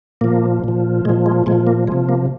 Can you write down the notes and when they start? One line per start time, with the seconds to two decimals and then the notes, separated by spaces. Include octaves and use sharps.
0.21 A#2 F3 A#3
0.64 A#2 F3
1.05 A#2 G#3
1.09 F3
1.26 G#3
1.46 A#2 F3 G#3
1.67 A#3
1.87 C3 F3 G#3
2.09 A#3